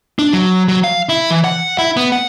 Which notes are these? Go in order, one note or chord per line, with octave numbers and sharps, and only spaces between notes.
D4
F#3
F#3
F5
E4
E3
F#5
E4
B3
F#5